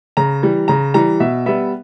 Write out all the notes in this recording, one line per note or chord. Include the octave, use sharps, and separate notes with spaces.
C#3 A#5
E3 G3
C#3 A#5
E3 G3 A#5
B2 E5
G3 B3 E5